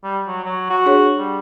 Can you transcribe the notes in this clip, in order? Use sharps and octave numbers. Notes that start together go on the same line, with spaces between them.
G3
F#3
F#3
F#4
D4 G#4 C#5
G3